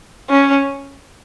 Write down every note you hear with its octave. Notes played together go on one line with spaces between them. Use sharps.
C#4